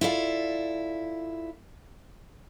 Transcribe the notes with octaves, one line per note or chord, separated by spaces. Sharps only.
E4 F4 A4 D5 E5 F5